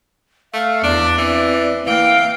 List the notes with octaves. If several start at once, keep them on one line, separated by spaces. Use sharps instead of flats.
A3 F5
E2 D4 D5
E3 C4
E3 A#3 F5 G5